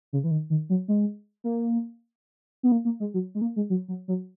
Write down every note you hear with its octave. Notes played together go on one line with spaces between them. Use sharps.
C#3
E3
D#3
D#3
F#3
G#3
A#3
B3
A#3
A#3
G#3
F#3
G#3
A#3
G#3
F#3
F#3
F#3